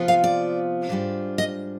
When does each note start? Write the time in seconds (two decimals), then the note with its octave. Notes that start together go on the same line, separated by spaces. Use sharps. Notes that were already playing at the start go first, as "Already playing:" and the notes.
Already playing: C3 F3 B3 F4
0.08 F5
0.24 D5
0.89 G#2 G3 D4 F4
1.38 D#5